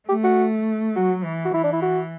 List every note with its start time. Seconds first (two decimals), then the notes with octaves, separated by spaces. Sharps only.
0.09 A3 G4
0.24 F#4
0.96 F#3 F#4
1.24 E3
1.45 F#4
1.54 E3 E4
1.64 D4
1.73 E4
1.82 F#4